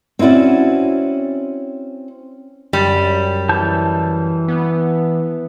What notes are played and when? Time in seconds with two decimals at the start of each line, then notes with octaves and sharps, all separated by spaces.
0.19 C4 C#4 E4 F#4 D5
2.73 F#2 G3
3.49 E3 A5 G6
4.48 B3